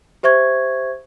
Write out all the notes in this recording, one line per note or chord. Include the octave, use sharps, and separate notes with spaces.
G4 C5 E5 C#6 G#6